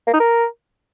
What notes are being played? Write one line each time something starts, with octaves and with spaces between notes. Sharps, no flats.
A#3
D#4
A#4